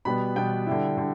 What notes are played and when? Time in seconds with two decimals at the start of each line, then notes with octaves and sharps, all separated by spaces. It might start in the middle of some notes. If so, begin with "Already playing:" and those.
0.05 B2 G3 B3 B5
0.36 B2 G3 B3 G5
0.66 D3 G3 E4
0.98 D3